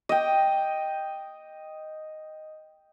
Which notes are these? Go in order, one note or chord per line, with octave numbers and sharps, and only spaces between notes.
D#5 G5